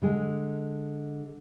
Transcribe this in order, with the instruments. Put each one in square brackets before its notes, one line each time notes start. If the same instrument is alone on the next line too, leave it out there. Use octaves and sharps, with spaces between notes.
[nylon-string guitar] D3 G#3 G#4